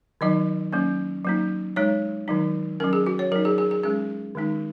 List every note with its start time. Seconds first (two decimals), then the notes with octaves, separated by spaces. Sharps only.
0.21 D#3 F#3 D#4 D#5
0.73 F#3 A#3 C#4
1.24 F#3 A#3 D#4
1.76 G#3 D#4 C#5
2.28 D#3 F#3 D#4
2.80 F#3 C#4 A#4
2.93 G#4
3.06 F#4
3.19 C#5
3.32 F#3 D#4 A#4
3.45 G#4
3.58 G#4
3.71 G#4
3.83 G#3 C#4 G#4
4.35 D#3 G#3 D#4